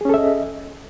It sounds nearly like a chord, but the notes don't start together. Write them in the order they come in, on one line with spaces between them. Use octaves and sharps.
G#4 C#4 A4 E5 D#5